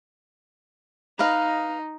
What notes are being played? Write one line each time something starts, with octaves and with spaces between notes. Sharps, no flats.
D#4 B4 D#5 F5